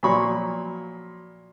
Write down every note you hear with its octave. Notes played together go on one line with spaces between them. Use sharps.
A#2 F3 F#3 C#5 B5 C#6